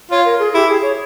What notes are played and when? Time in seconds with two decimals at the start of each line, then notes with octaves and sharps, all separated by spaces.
0.11 F4 C#5
0.25 A#4
0.39 G#4
0.54 E4 G4
0.68 G#4
0.82 C#5